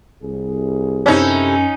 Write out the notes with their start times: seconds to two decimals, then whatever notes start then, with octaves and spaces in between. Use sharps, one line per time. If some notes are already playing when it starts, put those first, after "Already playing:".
0.23 C2 G#4
1.06 F#2 C3 C#4 D#4 E4 A4